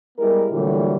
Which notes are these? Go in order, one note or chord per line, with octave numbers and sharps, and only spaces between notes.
G3 G#3 B3 E4 A#4
A#2 D3 E3 F#3 G3 A3